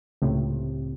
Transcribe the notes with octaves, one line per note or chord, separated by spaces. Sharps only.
C#2 A2 C3